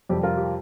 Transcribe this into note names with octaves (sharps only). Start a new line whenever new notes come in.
F2 C3 G3 G4
F4 A#4
G4